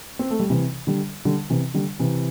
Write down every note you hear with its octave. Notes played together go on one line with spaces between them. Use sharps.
C4
A3
G3
C3 E3
D3 G3
D3 G3
C3 E3
D3 G3
C3 E3